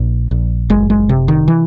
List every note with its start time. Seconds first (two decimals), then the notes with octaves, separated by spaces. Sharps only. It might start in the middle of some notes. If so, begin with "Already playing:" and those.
Already playing: A#1
0.31 A#1
0.70 F#1 G#3
0.90 G#3
1.09 C3
1.28 D#3
1.48 E3